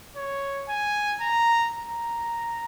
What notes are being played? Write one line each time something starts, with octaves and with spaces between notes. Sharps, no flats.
C#5
G#5
A#5
A#5